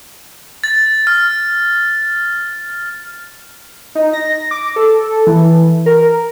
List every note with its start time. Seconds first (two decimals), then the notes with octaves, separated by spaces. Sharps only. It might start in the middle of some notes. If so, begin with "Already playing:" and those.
0.64 A6
1.07 F6
3.95 D#4
4.13 A#6
4.51 D6
4.76 A4
5.27 E3
5.86 A#4